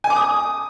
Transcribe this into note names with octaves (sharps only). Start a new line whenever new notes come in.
G#5
D6
D#6